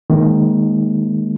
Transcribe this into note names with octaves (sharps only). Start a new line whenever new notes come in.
D#3 G#3 A#3 D#4